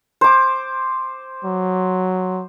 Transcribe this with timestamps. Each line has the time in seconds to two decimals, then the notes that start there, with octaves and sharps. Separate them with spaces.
0.21 C5 D6
1.45 F#3